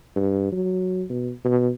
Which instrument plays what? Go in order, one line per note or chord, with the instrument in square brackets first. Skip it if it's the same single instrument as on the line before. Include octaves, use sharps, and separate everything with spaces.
[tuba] G2
F#3
B2
B2